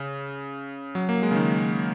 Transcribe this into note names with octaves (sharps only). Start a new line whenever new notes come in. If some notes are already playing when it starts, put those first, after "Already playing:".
Already playing: C#3
F#3
A#3
G#3
C#3
D#3